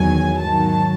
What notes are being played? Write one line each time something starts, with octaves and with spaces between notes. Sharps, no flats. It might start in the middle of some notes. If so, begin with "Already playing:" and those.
Already playing: E2 D#3 F#3 G#5
G#2 D#3 F#3 A5